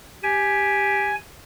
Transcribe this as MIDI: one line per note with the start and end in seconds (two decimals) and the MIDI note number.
0.23 1.16 67
0.23 1.15 80